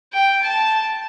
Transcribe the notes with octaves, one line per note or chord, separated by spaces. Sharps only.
G5
A5